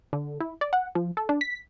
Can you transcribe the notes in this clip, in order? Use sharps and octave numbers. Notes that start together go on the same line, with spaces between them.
D3
E4
D5
F#5
F3
A4
D4
B6